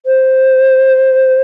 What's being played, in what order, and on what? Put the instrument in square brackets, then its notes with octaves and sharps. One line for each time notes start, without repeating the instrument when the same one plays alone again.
[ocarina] C5